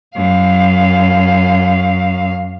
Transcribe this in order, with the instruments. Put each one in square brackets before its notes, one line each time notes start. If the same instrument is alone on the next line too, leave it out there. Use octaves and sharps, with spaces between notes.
[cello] F#2 F5